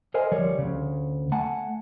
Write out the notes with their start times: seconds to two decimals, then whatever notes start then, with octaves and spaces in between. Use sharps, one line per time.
0.14 A4 A#4 C5 D#5 G#5
0.32 D2 F3 G3 C#5 D5
0.58 D2 C#3
1.32 A3 F#5 G#5 A5